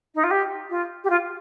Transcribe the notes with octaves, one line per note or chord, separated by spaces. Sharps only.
D#4
F4
G4
F4
G4
F4